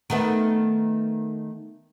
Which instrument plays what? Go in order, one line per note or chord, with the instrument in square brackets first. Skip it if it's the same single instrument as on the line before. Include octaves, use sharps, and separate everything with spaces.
[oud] D#3 A3 B3